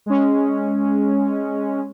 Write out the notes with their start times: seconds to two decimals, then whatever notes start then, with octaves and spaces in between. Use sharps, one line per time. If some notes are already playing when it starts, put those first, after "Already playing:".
0.06 G#3 C#4